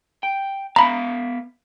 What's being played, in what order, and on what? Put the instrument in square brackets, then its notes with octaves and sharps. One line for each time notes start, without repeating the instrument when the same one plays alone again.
[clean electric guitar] G5
[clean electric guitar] B3 E5 F5 [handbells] A#5 B5